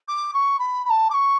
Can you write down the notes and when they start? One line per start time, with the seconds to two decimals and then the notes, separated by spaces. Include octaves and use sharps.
0.08 D6
0.33 C#6
0.59 B5
0.85 B5
0.89 A5
1.10 D6
1.13 C#6